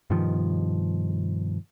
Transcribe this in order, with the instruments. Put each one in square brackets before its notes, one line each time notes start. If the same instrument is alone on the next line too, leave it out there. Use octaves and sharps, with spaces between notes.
[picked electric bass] G2 B2 D#3 F3